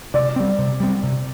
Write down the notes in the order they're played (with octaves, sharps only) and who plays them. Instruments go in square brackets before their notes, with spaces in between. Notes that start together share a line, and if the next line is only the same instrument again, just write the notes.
[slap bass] C3 [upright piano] D5
[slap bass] G3 C4
C3
G3 C4
C3